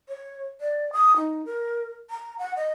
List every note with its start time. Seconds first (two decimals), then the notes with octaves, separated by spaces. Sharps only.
0.09 C#5
0.61 D5
0.93 D#6
1.16 D#4
1.46 A#4
2.10 A#5
2.39 F#5
2.56 D#5